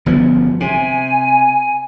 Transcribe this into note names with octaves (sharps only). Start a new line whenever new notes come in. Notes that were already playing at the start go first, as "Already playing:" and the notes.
G1 F3 B3
C3 G#5